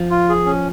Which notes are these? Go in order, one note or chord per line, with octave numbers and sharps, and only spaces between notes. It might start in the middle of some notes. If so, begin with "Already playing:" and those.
Already playing: F3
F4
G#4
C#4